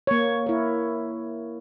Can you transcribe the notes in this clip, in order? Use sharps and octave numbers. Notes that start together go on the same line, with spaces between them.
A#3 C#5
E4 A#4